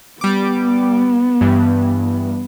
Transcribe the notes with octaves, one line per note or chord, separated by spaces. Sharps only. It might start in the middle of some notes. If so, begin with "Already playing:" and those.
G3 B3 D6
G2 E3